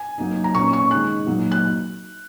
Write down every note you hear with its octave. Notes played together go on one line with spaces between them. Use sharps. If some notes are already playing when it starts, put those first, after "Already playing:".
Already playing: G#5
F#3 A#3 D#4
A#5
A#2 A#3 C#4 C#6
C#6
D#3 G#3 D#4 F#6
A#2 F#3 A#3 D#4
F#6